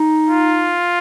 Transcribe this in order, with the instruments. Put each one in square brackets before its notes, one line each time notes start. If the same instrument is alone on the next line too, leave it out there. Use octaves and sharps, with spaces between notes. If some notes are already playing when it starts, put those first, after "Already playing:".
Already playing: [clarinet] D#4
[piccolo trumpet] F4